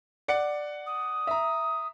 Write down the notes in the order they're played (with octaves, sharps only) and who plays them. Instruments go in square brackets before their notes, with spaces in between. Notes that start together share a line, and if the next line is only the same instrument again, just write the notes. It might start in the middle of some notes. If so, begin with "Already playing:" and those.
[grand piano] D5 F#5 C#7
[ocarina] D#6
[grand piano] E5 A#5